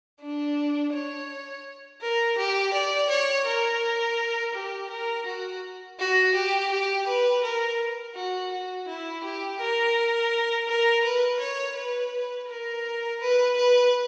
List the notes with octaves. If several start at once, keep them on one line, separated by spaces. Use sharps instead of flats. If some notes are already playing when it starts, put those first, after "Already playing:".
D4
C#5
A#4
G4
D5
C#5
A#4
G4
A#4
F#4
F#4
G4
G4
B4
A#4
F#4
F#4
E4
G4
A#4
A#4
B4
C#5
B4
A#4
B4
B4